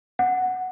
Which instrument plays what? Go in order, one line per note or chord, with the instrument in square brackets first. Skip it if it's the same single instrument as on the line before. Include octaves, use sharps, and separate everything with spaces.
[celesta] F#5